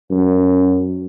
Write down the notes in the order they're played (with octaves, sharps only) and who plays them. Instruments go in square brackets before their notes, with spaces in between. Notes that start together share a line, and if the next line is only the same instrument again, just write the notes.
[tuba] F#2